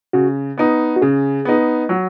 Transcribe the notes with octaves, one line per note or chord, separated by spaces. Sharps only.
C#3 F#4
B3 D#4
F#4
C#3 G#4
B3 D#4
F#3